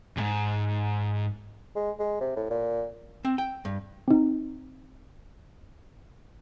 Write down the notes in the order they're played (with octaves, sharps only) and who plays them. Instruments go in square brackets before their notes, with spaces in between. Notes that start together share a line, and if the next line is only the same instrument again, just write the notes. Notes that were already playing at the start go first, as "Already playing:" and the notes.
[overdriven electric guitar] D#2 G#2
[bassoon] G#3
G#3
C3
A2
A#2
[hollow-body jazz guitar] C4
G5
G2
[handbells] C4 D#4